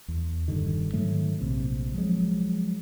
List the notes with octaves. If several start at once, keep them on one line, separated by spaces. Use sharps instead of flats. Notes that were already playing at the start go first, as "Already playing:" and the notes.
E2
F1 G2 D3 D#3
G#2 D#3 F#3 A3
A#1 C3
F3 F#3 G#3